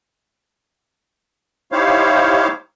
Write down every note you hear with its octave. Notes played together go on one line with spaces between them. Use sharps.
D#4 E4 G4 C5 C#5 F5